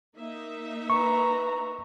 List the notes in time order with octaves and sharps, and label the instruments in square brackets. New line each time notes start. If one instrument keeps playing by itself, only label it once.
[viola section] A#3 D#4 E5
[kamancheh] B4 A#5 [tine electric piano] C#6